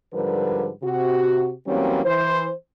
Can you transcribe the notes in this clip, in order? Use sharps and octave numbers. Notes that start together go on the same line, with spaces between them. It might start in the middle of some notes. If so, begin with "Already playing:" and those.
G#2 D3 F3 G3 A#4 B4
C3 F#4
E3 F#3 G3 A#3 C4 C#4
E3 C5